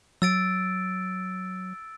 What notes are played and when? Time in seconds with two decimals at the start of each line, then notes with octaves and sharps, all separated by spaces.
0.22 F#3 E6 A6 D7